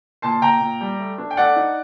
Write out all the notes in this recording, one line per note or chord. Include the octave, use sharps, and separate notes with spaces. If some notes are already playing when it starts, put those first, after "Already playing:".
A#2 A5 C6
A#2 G5 A#5
A#2
G3
A3
D4
G5
A3 D5 F#5
D#4